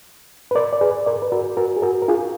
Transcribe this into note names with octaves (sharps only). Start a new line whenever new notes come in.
B4
A#4 D5
D5
G#4 B4
A#4 D5
B4
F#4 A#4
F#4 A#4
G#4
F#4 A#4
A#4
F4 G#4